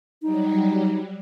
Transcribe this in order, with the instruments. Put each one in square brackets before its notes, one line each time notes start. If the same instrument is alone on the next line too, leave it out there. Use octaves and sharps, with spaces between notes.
[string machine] F#3 G3 [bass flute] D#4